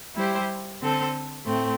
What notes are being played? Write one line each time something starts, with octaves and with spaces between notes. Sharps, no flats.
G3 E4 G4 C5
D3 C4 A4 C5
A2 A3 C4